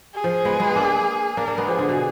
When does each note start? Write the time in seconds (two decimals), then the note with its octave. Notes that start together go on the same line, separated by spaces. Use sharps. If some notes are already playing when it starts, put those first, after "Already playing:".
0.14 G#4
0.24 F3
0.45 G#3 B3
0.60 G#3 B3
0.76 A#3 D4
1.37 A#3 D4 A#4
1.47 A#3 D4
1.58 G#3 B3
1.68 F3 G#4
1.79 D3
1.89 B2